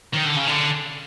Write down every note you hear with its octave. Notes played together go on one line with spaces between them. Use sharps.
D#3
D3
C#3
D3